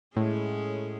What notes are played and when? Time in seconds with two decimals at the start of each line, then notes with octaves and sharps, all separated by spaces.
0.16 A2 G#3 C#4 G#4